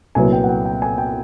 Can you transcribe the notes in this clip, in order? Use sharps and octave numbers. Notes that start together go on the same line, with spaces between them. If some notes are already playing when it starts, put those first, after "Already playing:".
C2 A#2 F#3 B3 G#5
G5
F#5
G5
G5
G#5
G5